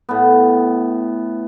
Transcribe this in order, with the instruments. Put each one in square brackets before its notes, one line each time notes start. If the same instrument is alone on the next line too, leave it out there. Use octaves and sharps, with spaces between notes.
[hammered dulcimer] A2 B3